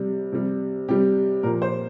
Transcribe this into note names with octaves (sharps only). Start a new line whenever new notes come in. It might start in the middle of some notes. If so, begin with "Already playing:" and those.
Already playing: C3 G3
C3 G3
C3 G3 G4
A#2 F3 A#4
C5